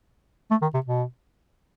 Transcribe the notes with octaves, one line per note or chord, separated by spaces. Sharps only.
A3
D#3
C3
B2